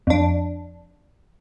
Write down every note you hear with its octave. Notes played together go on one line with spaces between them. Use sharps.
F2 D4